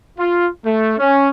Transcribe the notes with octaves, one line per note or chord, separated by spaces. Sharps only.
F4
A3
C#4